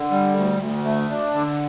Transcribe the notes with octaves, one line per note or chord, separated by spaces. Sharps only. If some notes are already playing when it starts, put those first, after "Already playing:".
Already playing: D3
G3
D2
D2
A3
D4
D3